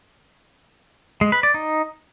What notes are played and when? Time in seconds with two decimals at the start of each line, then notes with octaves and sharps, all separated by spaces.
1.21 G#3
1.32 B4
1.43 D5
1.54 D#4